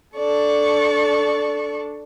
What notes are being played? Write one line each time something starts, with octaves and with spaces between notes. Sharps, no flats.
D4 A4 D5 C#6